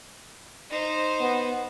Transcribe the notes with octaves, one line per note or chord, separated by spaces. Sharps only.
D#4 C5
B3